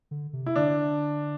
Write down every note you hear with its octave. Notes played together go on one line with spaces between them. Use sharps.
D3
C3
E4
D3 D4